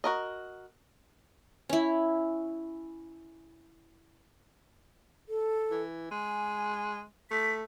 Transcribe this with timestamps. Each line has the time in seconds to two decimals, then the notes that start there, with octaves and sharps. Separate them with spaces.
0.04 F#4 A#4 D#5
1.69 C#4 E4
5.29 A4
5.71 E3
6.11 G#3 G#5
7.31 A3 B6